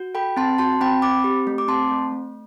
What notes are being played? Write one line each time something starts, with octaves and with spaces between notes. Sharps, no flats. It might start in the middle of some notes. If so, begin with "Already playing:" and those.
Already playing: F#4
A4 G5 B5
C4 A5 C6
F#4 A5 C6
C4 G5 B5
C4 B5 D6
G4
A3
D6
C4 A5 C6
A3
A3